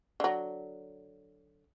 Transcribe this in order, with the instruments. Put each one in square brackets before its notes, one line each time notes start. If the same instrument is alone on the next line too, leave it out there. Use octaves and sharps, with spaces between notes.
[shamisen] D3 F#3